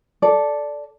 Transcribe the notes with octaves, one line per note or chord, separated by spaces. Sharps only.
A4 D5